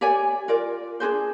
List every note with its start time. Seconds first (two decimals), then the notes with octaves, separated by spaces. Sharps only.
0.01 G4 C#5 D5 G#5
0.48 F4 A#4 D5
1.00 D4 F#4 G#4 C5